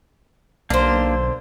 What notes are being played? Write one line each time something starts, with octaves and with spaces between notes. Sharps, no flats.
B1 D3 A#3 D4 C5